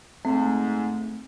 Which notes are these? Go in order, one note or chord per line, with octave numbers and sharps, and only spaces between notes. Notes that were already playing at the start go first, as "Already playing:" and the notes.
G#2 A3 C4